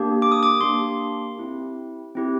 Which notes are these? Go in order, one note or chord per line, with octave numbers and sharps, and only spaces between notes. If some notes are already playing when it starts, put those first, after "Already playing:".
Already playing: A#3 D4 G4
D6
D#6
D6
A#3 D4 G4 C6
C4 E4 G4
C4 E4 G4